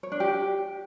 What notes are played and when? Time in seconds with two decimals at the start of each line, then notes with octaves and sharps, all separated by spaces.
0.03 C#5
0.12 D4
0.20 G4